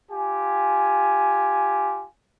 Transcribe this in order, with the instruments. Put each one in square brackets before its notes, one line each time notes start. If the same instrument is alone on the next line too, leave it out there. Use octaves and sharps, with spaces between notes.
[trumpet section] F4 G4 G#5